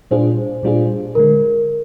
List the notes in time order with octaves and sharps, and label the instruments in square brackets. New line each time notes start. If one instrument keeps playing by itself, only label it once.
[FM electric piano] A#2 G3 D4 F4 G#4 [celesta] C5
[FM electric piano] A#2 G3 D4 F4 G#4
[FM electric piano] D3 G#3 [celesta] A#4